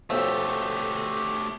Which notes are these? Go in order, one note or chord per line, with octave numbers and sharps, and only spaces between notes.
B1 F3 A3 G4 E5